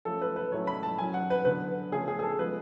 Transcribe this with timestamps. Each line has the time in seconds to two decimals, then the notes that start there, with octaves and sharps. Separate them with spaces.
0.05 F3 A3 C#4 A4
0.22 B4
0.36 B4
0.52 A2 F#3 A3 C#4 C#5
0.67 B5
0.83 A5
0.98 A2 F#3 C#4 G#5
1.14 F#5
1.30 B4
1.45 D3 F#3 B3 B4
1.92 C#3 F3 A3 C#4 G#4
2.08 G#4
2.19 G#4
2.23 A4
2.39 F3 G#3 B3 B4